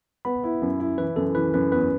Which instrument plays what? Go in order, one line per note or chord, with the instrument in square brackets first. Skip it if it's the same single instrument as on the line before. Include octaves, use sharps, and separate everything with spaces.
[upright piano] B3 [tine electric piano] B5
[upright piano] E4
F#2
E4
[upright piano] E3 [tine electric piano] B4
[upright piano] F#2 [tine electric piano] A4
[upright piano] E3 [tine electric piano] B4
[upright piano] F#2 [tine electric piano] B4
[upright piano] E2 [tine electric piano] B4